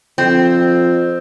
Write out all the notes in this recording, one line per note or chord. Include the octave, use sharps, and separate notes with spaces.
F2 C4